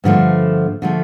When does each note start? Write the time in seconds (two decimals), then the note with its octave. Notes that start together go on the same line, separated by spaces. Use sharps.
0.04 G2 D3 F3 A3
0.82 D3 F3 A3